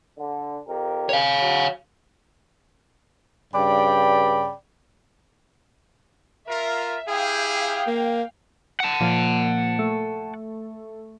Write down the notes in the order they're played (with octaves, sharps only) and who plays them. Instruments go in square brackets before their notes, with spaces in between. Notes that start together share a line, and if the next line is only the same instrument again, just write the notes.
[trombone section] D3
F2 G4 A#4
[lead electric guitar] C#5 F5
[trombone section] F#3
[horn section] G2 C#3 D5 G5 B5
[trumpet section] F4 A#4 [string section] E5
[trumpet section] E4 G4 G#4 [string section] F5 G5
[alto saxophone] A#3
[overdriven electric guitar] F#5 A5
[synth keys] A#2 F3 A#3
A3